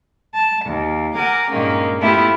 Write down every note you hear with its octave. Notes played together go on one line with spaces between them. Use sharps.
A5
D#2
A#4 F#5 G#5 D6
G2 A#2 D#3 G#3 A#3 C#4
A3 B3 E4 F4 G4 A4